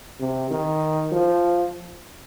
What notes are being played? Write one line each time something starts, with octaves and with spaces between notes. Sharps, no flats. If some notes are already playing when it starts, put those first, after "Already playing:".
C3
D#3
F3